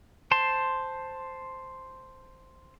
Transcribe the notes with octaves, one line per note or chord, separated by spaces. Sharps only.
C5 A5 C6